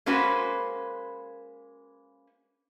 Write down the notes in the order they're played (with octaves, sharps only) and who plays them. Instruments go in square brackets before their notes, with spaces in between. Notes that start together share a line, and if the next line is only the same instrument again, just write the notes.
[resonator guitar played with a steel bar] G#3 A#3 C#4 F#4 B4 C5